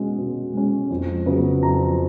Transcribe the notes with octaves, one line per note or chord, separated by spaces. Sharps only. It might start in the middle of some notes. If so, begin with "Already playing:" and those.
Already playing: B2 G#3 C#4
B2
G#3 C#4
F2
C#3 F#3 B3
F2 A#5